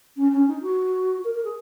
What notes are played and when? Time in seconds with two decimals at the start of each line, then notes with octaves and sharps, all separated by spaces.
0.17 C#4
0.32 C#4
0.48 D#4
0.62 F#4
1.25 A#4
1.35 A#4
1.45 G#4